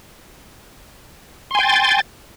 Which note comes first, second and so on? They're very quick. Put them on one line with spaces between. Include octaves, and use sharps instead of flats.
C6 G#5 G5 A6